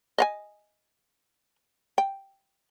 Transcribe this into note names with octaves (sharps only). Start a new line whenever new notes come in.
D#5 F5 G#5
G5